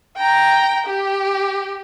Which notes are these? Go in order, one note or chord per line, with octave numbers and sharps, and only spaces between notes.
G5 A#5
G4